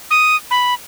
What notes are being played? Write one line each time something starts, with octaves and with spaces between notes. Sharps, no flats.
D#6
B5